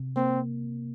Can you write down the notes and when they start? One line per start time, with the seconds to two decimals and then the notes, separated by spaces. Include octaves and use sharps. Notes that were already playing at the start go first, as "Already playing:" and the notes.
Already playing: C3
0.16 A#3 C4